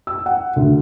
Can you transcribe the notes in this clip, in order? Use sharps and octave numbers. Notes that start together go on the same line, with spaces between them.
E6
F#5
D2